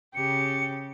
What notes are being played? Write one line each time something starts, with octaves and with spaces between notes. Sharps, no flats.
C#3 G4 C#7